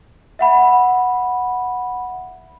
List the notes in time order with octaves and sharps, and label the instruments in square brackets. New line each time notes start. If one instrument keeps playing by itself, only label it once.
[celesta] E5 F#5 B5